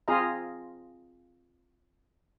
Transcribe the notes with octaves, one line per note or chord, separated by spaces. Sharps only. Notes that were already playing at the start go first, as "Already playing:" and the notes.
C4 F4 G#4 D#5 F5 A#5